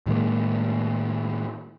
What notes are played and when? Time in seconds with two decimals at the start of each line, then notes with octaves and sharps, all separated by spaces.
0.06 A2 D#3 G#3 A#3